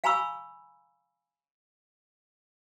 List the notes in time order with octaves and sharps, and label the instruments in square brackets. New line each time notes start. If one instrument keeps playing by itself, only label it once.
[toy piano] F5 G#5 A#5 B5 C#6 E6